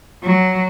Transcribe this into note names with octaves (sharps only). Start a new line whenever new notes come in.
F#3